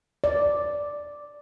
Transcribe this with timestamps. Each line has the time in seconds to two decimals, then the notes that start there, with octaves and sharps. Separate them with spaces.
0.24 D5